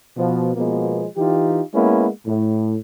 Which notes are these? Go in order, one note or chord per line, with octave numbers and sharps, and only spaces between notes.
B2 F3
B2 F3 G#3 A#3 B3
E3 D#4 F4 G4
G#3 A#3 B3 C#4 E4
A2